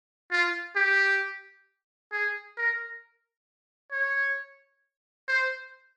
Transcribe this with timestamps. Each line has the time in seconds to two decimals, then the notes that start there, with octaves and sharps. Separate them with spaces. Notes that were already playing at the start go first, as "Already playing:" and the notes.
0.32 F4
0.76 G4
2.12 G#4
2.58 A#4
3.92 C#5
5.28 C5